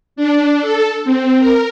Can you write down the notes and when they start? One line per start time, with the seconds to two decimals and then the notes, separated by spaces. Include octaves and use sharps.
0.16 D4
0.61 A4
1.04 C4
1.39 A#4